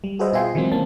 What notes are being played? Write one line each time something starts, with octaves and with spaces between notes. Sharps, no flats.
G3
F#4 G#4 B4 C5 D#5 E5
B2 F4 E5 G5 G#5 C6
D#3 E3 F#3 G#3 C4
E3 A#3 C4 C#4 A5